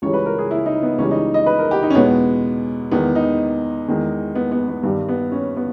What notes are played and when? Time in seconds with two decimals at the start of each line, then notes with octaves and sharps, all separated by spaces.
0.02 C#2 C#3 E3 G3 C#5
0.14 B4
0.26 A#4
0.39 G#4
0.51 E4
0.66 D#4
0.83 B3
0.98 C#2 C#3 E3 G3 C#4
1.11 D#4
1.34 D#5
1.46 B4
1.59 A#4
1.71 G4
1.83 D#4
1.90 C#4
1.94 E2 B2 G#3 B3
2.91 E2 D#3 G#3 B3
3.15 D#4
3.88 E2 D#3 G#3
4.35 B3
4.52 B3
4.68 B3
4.83 G2 D#3 G3
5.09 B3
5.32 C#4
5.57 B3